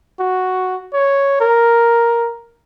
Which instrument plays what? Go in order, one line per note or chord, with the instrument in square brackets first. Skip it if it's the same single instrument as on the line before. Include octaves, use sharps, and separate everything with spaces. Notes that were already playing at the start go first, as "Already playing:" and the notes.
[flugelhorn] F#4
C#5
A#4